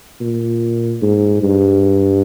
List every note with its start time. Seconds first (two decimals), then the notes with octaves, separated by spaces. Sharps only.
0.21 A#2
1.02 G#2
1.43 G2